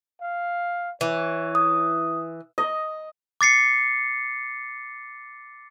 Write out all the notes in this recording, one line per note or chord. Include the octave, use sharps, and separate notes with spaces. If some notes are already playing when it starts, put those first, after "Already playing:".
F5
E3 C#5
D#6
D#5
D6 A6 C7 C#7